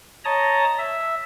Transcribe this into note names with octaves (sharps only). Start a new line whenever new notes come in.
C#5 D#5 A5 A#5 D#6
E5